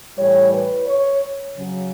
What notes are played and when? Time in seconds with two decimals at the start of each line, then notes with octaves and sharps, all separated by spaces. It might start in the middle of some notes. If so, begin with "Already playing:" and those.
0.18 A2 E3 G3 C#5
0.53 B4
0.87 C#5
1.57 C#3 F#3